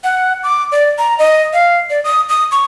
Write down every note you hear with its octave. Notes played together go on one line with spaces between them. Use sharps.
F#5
D6
D5
A#5
D#5
F5
D5
D#6
D#6
C#6